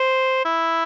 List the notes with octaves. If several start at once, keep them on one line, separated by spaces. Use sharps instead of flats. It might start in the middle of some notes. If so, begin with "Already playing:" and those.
Already playing: C5
E4